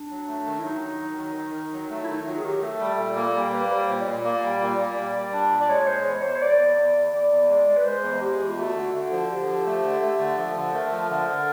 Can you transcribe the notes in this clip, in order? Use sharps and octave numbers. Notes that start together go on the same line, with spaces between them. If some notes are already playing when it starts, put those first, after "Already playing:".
Already playing: D4
F#3
A3
D#3
E4
F#3 D#4
D#3
F#3
D#3
D#3
D#3
F#3
A3
E4
D#3 D#4
F#3 F4
G#4
D#3 G4
A3 A4
G3
A#2
A#3
G3
A#3 B4
B4
G3 C5
A#2 C#5
D#5
A#2 D5
A#3
G3
A#2
A#3
G3
G3
D4
A#2
D5
G#3 C#5
G#3 C5
E2 C#5
E2 C5
C#5
E2 D5
E2
E2
E2
E2 D5
E2
G#3
G#3
B4
G#3 C5
E2
G#3 G4
E2
F4
A3 F#4
D3
D3
F3
D3 G4
F3
A3
D3
A3
D3
F3
D3
A3 A#4
F3
D3
D3